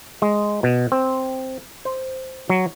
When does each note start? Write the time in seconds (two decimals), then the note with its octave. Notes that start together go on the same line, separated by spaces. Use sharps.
0.22 G#3
0.63 B2
0.92 C4
1.85 C5
2.50 F#3